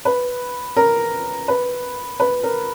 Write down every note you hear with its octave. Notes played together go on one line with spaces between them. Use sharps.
B4
A#4
B4
B4
A#4